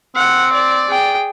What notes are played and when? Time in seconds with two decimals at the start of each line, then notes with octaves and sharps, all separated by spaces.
0.16 C4 F#5
0.54 D5
0.88 G#4 G5